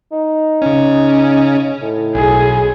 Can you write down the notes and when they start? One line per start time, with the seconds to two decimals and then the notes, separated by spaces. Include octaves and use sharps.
0.12 D#4
0.62 C#3 C#4
1.82 A2
2.15 B1 G#4